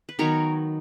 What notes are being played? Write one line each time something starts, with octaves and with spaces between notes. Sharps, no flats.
B4
D#3 F#3 B3 A#4 C#5